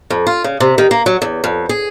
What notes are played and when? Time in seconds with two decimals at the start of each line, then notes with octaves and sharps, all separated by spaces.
0.10 F2
0.27 F4
0.44 C#3
0.60 C3
0.78 D#3
0.91 A#3
1.06 F#3
1.22 E2
1.44 F2
1.69 G#4